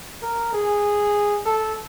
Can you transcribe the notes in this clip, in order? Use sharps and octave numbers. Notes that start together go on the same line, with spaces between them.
A#4
G#4
A4